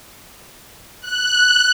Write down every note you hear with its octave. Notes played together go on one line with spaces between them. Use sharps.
F#6